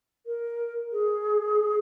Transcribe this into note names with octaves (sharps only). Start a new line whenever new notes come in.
A#4
G#4